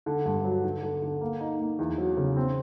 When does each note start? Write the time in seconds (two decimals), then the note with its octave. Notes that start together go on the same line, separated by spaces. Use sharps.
0.06 D3
0.25 G2
0.44 F#3
0.64 D3
0.83 D3
1.02 D3
1.21 A#3
1.40 D#4
1.59 A#3
1.79 E2
1.98 F#3
2.17 C#3
2.36 C4